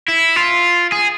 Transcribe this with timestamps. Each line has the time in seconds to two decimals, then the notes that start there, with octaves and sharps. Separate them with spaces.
0.08 E4
0.36 F4
0.92 G#4